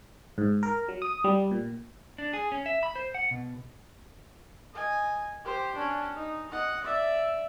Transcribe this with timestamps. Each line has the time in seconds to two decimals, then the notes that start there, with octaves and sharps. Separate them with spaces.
0.38 G#2
0.63 A#4
0.88 F#3
1.02 D#6
1.24 G3
1.51 A#2
2.18 D4
2.33 G#4
2.52 C#4
2.66 E5
2.83 B5
2.96 C5
3.15 F#5
3.31 B2
4.73 D#5 G#5
5.44 G4 C5
5.75 C#4 D4
6.15 D#4
6.51 D#5 F#5
6.83 D5 E5